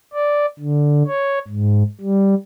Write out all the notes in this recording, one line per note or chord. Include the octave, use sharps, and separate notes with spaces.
D5
D3
C#5
G#2
G3